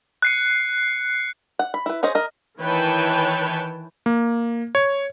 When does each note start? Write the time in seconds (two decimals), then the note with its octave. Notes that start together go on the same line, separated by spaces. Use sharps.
0.22 F#6 C7 C#7
1.59 F#5
1.74 B5
1.86 E4 B4
2.03 C#4 G#4 C5 D#5
2.15 A#4 D#5
2.60 D#3 E3 B4 C#5 G5 A5
4.06 A#3
4.75 C#5